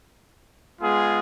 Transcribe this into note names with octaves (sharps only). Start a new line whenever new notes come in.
G#3 B3 F4 G#4